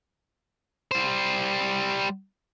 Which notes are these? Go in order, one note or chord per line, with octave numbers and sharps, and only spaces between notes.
G3 C5